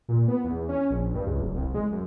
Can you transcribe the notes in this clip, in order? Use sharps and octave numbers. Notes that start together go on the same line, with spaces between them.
A#2
B3
E2
C#4
A#1
G2
C#2
D1
C2
G#3
F#2